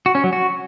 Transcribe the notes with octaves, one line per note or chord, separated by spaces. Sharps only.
F#4
C#4
F#3
F#4